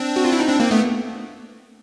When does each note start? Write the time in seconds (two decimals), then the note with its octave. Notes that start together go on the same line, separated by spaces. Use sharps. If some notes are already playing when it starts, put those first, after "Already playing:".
Already playing: C4 D4
0.16 F#4
0.25 F4
0.32 E4
0.40 D#4
0.49 C4 D4
0.60 A#3 C4
0.71 A3 B3